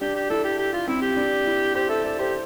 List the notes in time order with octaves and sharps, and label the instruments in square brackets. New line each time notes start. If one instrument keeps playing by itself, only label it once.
[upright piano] D4 [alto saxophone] G4
[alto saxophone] G4
[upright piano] E4 [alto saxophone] A4
[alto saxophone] G4
G4
F4
[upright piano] C4 [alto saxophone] E4
[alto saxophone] G4
[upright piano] D4
E4
[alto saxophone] G4 [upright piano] C5
[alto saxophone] A4 [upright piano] E5
[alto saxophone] A4 [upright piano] D5
[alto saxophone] G4 [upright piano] C5